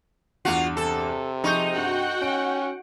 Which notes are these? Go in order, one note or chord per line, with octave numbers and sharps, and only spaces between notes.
E2 G2 F4 F#4
C3 A4
F3 D#4 G#4 D#5 C#6 G6
G2 F#4 F#5 G5
C#4 D7